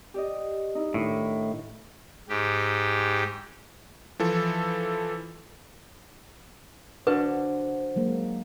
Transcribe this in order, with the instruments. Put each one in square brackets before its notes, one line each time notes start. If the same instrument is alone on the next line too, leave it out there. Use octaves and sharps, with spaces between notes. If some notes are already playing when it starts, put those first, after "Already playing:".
[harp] G4 D5 D#5
D#4 E4
[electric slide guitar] A2 [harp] D#3 D4 E4
[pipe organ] G#2 G4
[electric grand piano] E3 F3 A4
[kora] D3 [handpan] F#4 [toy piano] B4 [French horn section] C5
[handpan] F#3 G#3 A#3